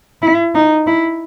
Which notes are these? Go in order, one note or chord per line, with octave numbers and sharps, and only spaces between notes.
E4
D#4
E4